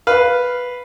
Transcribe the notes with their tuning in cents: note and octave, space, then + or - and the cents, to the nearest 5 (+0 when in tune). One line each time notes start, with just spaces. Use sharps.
B4 +0 F5 +0